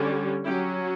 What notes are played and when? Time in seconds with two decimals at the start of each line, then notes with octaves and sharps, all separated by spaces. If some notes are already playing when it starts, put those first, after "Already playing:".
Already playing: D3 G3 C#4
0.45 F#3 E4 G4
0.50 C#4